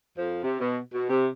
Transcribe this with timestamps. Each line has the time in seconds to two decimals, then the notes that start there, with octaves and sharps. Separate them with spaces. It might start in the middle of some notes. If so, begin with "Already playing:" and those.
0.18 F2 F3
0.43 C3
0.60 B2
0.93 B2
1.10 C3